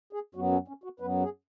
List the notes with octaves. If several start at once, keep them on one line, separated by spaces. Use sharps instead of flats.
G#4
F#2 F#3 B3 F#4
C#4
C#4
F#4
F#2 F#3 B3 B4
G#4